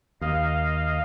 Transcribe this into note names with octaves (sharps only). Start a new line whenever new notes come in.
D#2 D#5 F5